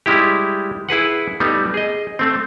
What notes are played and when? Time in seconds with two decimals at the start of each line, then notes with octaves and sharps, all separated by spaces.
0.06 G3 G#3 E4 G4
0.89 E4 G#4 B4 F#5
1.40 G3 A3 B3 D#4
1.74 G#4 D#5
2.19 A3 C4